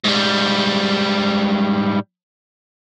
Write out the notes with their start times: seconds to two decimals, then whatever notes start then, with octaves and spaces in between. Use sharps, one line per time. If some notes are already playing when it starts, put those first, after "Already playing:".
0.05 G#2 G3